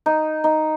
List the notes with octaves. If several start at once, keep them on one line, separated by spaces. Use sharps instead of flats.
D#4
D#4